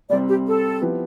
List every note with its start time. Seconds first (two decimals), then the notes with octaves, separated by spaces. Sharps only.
0.10 C2 C3 G3 C4 D5
0.28 G4
0.46 A4
0.81 F3 B3 E4 G4 B4